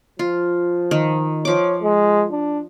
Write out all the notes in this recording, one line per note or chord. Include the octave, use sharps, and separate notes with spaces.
F3 F4
D#3
F3 C#5 D6
G#3
D4